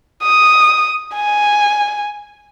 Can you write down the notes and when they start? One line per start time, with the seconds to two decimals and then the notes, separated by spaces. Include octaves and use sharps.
0.23 D#6
1.16 G#5